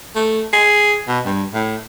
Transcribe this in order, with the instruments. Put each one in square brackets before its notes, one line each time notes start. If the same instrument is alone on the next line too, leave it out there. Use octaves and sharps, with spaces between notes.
[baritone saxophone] A3
G#4
B2
G2
A2